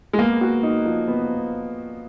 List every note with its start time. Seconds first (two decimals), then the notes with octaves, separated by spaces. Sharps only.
0.13 G#3
0.19 A#3 B3
0.41 F#4
0.63 D#4
0.85 F3
1.08 B3